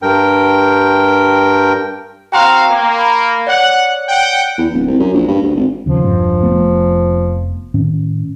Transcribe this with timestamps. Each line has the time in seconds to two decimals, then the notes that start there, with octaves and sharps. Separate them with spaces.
0.02 G2 A#4 G5
2.32 C4 F#4 F5 G5 A#5 C6
2.70 A#3
2.99 B5
3.47 C#5 D5 F#5
4.07 F#5 G5
4.58 E2
4.73 D1
4.87 C2
4.99 F#2
5.14 A#1
5.28 G2
5.42 D2
5.56 G#1
5.86 D#2 C#3 F3
6.02 E1 G2
6.43 F1 A3 B3
7.74 A2 D#3 C#4